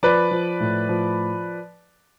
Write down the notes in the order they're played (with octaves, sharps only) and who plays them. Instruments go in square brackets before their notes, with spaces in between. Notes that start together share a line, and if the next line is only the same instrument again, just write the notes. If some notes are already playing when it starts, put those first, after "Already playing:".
[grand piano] F3 B4 D5
F3
A2
F3